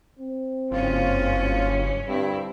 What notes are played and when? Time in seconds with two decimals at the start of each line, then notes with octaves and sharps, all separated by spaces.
0.20 C4
0.71 F#1 G2 C#4 F4
2.08 D2 G2 C4 E4